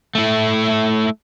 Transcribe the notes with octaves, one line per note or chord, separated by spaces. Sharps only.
A3 E4